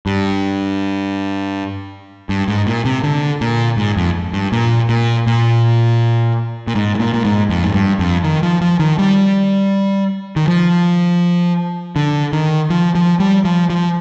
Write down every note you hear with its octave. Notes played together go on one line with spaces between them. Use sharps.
G2
G2
G#2
A#2
C3
D3
A#2
G#2
F2
G2
A#2
A#2
A#2
A#2
G#2
G#2
A#2
A#2
G#2
F2
G#2
G2
F2
D#3
F3
F3
D#3
G3
D#3
F3
D3
D#3
F3
F3
G3
F3
F3